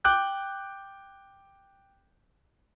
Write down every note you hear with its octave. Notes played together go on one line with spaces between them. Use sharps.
G5 D6 F#6 G6